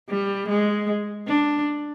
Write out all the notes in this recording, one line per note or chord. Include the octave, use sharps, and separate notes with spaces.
G3
G#3
D4